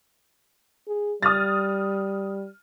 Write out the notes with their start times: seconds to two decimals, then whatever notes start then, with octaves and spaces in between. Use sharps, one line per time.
0.88 G#4
1.23 G3 D#6 F6 A6